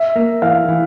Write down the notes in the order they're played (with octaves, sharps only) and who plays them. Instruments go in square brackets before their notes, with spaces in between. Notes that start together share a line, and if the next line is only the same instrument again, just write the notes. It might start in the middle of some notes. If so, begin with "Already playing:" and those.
Already playing: [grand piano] E5
[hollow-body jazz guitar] A#3
[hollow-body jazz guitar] E3 [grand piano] F5
[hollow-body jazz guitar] E3